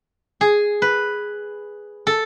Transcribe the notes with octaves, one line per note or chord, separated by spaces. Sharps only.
G#4
B4
A4